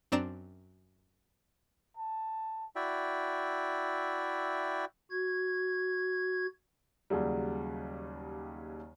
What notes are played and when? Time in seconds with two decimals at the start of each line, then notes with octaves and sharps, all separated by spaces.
0.12 F#2 C4 D4 D5 A#5 E7
1.97 A5
2.76 E4 F#4 D5 E5 G5
5.11 F#4 G#6
7.10 D#2 C#3 F#3 G3